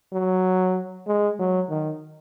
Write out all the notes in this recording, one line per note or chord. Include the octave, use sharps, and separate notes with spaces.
F#3
G#3
F#3
D#3